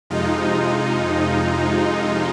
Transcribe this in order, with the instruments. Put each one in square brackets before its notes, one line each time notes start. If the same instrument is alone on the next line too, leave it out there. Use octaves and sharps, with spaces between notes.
[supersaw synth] F2 C3 G#3 F4 [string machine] D#4